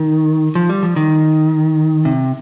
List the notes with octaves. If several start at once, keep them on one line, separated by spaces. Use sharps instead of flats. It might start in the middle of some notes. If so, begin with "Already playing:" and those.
Already playing: D#3
F3
G3
F3
D#3
C3